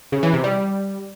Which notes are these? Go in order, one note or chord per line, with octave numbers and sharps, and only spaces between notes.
C#3
E3
C3
G3